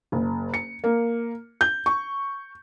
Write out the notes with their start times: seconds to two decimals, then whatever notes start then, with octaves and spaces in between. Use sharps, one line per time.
0.12 F#1
0.54 C#7
0.84 A#3
1.61 G6
1.86 C#6